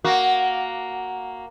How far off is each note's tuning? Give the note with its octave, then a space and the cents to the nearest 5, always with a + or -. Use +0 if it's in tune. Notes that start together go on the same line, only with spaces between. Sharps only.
A#3 +0 F#4 +0